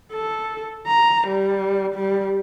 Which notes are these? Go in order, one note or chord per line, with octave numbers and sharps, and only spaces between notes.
A4
A#5
G3
G3